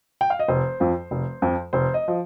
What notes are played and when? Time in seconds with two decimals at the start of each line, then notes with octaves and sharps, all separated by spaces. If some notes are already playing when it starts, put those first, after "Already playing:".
0.21 G5
0.30 F5
0.39 D#5
0.48 F1 C5
0.80 F2 F3
1.11 F1
1.42 F2 F3
1.73 F1 C5
1.94 D#5
2.08 F3